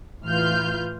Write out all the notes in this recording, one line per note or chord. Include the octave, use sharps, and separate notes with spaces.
A2 E3 F4 B4 F6 G6